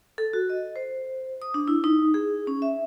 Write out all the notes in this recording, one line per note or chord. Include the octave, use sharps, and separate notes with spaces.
A4
F#4
D#5
C5
D#6
D4
E4
D#4
G#4
C#4
E5